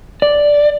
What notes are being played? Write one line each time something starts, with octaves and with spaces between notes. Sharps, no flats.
D5